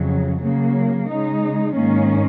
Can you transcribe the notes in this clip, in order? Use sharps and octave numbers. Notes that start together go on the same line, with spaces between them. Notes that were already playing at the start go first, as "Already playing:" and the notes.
Already playing: F2 C#3 F#3
C#3 F#3 A#3
C#3 G#3 D#4
G#2 D#3 A#3 C#4